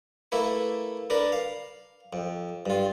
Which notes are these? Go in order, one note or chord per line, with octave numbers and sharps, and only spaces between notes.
A3 A#3 E4 B4
D4 A#4 B4
F5
F2
G2 F4